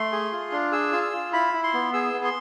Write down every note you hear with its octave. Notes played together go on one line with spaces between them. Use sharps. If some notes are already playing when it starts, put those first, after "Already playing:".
Already playing: A3 C6
G#4
F4
D4
G#4 E6
F4
E6
F4
E4 B5
E4
C6
B3
G#4 E6
B3
C6